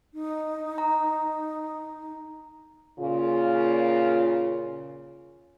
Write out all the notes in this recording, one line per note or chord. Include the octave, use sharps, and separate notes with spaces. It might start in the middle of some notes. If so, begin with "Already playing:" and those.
D#4
A#5
A#2 C#3 F4